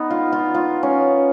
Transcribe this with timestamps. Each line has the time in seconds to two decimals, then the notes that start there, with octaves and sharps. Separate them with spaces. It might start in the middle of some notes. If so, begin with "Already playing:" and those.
Already playing: B3 D#4
0.10 F4
0.32 F4
0.54 F4
0.83 C#4